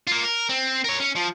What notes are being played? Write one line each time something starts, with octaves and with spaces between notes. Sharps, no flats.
A#3 F4
A#4
C4
A#4 C#5
C#4
F3